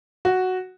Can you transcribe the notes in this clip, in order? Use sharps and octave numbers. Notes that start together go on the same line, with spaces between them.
F#4